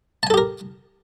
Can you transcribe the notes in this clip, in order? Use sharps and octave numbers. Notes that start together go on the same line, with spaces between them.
G4 A4 A#4 G#5 A5